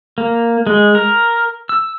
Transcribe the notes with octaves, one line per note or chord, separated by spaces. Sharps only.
A#3
G#3
A#4
E6